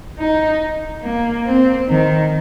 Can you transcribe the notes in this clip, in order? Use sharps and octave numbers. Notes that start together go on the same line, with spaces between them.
D#4
A#3
C4
D#3